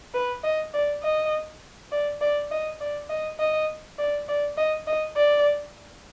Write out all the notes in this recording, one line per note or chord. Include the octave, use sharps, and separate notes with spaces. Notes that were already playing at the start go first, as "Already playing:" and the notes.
B4
D#5
D5
D#5
D5
D5
D#5
D5
D#5
D#5
D5
D5
D#5
D#5
D5